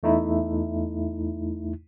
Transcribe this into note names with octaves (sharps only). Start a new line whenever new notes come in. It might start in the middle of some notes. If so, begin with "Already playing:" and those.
E2 A3 D#4 E4